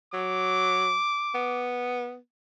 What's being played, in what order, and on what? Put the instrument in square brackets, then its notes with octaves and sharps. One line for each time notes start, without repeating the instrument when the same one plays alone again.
[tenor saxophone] F#3 [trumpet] D6
[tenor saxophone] B3